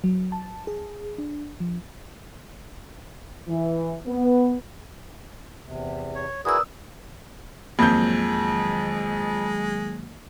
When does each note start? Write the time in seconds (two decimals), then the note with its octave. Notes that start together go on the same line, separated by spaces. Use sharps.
0.04 F#3
0.32 A5
0.67 G#4
1.18 D4
1.60 F3
3.47 E3
4.06 B3
5.63 E2 C3
6.15 C#5
6.45 E4 F#4 G#4 A#4 B4 D5 D#6 E6
7.79 F2 D#3 F#3 G#3 A#3 G6